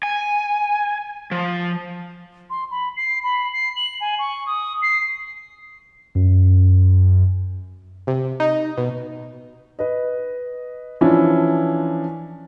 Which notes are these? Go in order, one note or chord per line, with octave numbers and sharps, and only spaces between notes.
G#5
F3
C6
B5
C7
B5
C7
F#7
G#5
C#6
D#6
C7
F#2
C3
D#4
B2
B4 D#5
E3 F3 C#4 D4 E4